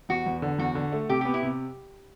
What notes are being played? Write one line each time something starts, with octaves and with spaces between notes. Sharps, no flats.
E2 F#4
E2
D3
E2 F#4
D3
A3
C3 G4
B3 G4
E4
C3